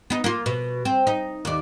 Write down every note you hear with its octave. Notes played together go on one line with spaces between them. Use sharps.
B3 D#4
A#3 F4
B2
C4
D#4
D#2 D5